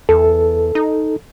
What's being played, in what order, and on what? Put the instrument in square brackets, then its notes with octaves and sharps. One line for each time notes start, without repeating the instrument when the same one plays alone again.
[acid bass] E2 [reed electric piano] A4
[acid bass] D#4